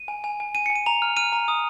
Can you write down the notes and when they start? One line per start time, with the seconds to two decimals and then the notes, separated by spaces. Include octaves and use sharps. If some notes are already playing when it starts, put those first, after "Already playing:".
Already playing: D#7
0.08 G#5
0.24 G#5
0.40 G#5
0.55 G#5 D#7
0.66 G#5 C#7
0.75 D#7
0.86 A#5 F7
1.02 F6
1.17 F6 D#7
1.32 A#5
1.48 D#6